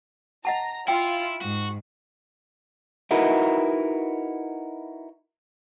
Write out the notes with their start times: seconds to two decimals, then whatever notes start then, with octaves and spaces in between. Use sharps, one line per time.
0.45 D#5 F#5 A5 A#5
0.88 E4 F4 F5 G5
1.41 G#2 F#4
3.11 D#4 E4 F#4 A#4 B4